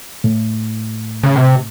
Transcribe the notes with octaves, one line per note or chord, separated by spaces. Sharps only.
A2
C#3
C3